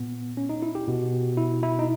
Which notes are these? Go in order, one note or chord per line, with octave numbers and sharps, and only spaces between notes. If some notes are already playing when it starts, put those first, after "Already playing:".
Already playing: A#2 B3
C#4
D#4
E4
G4
B2
E4
E4
D#4